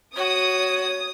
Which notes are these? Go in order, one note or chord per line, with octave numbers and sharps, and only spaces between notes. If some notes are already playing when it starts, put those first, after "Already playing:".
F#4 C#5 D#6